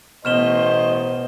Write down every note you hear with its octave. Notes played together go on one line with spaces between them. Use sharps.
A1 B2 C5 D#5 F6 E7 G7